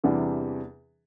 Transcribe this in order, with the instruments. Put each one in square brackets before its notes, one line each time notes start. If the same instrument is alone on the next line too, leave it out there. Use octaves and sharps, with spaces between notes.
[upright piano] E2 C3 E3 G3 D4